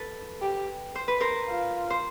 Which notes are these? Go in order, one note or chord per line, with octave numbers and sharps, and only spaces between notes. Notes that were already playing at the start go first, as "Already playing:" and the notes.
Already playing: A4 B4
G4
C5
B4
A#4 C5
F4
C5